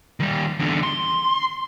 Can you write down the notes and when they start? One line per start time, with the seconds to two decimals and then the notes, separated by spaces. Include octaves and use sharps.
0.20 D#3 G3
0.59 E2 D3
0.83 C6